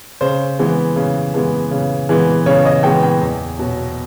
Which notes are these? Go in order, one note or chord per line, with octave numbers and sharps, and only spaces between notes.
C#3 C5
E3 G#3 B3
C#3
E3 G#3 B3
C#3
E3 G#3 B3
C#3 C#5
D#5
E3 G#3 B3 G5
G5
E2
B2 F#3